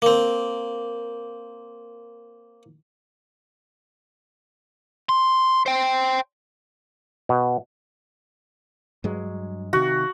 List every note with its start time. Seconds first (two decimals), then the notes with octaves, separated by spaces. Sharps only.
0.02 A#3 C4
5.09 C6
5.66 C5 G5
7.29 B2
9.04 G2 F#3 G#3
9.73 C3 D#3 F#4